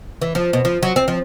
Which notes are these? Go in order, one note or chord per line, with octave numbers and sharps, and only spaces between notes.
E3
F3
B2
F3
F#3
C4
F3